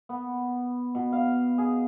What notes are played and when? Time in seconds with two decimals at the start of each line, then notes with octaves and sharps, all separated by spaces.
0.09 B3
0.95 B2
1.13 F5
1.58 G#4